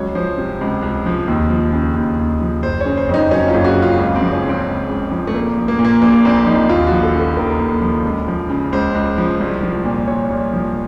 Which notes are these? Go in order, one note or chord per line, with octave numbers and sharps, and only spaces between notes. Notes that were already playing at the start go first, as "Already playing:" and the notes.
Already playing: C#2 F#3 C#5
F3 C5
C3
C#2
C#2
F3
D#2
F3
C#3
D#2
D#2
F3
F#1 C5
C#5
C#3
C5
F2 D#4
F#3 C#4
F4
F#1
F#4
C#3
F4
C#2 F4
C4
F3
C#4
C#3
C4
C#2
C#2
F3
A3
A#1 A#3
F3
A#3
A#2
A#3
A#1 A#3
A#1 C4
F3 D#4
D#2 F4
F3 F#4
A4
C#3 A4
D#2 A#4
D#2
F3
C#2
F3
C#3
C#2 C5
C#2
F3
C2
F3
A#2
C2 C#5
C2
F3